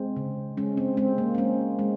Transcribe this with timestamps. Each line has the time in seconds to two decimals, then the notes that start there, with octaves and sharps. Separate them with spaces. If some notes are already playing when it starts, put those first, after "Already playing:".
Already playing: G#3 C4
0.16 C#3
0.57 G#3 C#4
0.77 C4
0.97 G#3 C4
1.18 A#3
1.35 C4
1.38 G#3 C#4
1.79 G#3